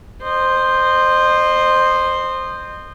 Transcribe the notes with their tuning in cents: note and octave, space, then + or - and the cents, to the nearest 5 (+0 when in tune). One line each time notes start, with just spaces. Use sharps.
C5 +0 D#5 -30